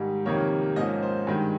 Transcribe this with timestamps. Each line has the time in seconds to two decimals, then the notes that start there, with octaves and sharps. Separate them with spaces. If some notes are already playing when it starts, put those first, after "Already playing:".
Already playing: G#2 D#3 G3
0.26 F2 C3 D#3 G3 A#3 C#5
0.76 G#2 F3 A#3 C#4 D#5
1.03 C5
1.27 G2 D#3 G#3